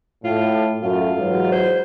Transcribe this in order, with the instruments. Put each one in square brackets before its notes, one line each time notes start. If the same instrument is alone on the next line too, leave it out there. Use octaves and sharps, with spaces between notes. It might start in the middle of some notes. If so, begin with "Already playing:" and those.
[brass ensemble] A2 [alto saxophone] F4
[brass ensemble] F#2 A3 F#4 [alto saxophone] F4
[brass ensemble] G#2 E3 F#3
[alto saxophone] C5